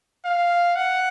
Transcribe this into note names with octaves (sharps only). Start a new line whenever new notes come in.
F5
F#5